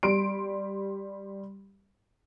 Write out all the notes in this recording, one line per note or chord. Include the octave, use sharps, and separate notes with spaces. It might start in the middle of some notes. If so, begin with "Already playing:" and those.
G3 C6 D7